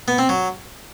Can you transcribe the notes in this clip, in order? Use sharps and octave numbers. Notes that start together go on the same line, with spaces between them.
B3
C4
F#3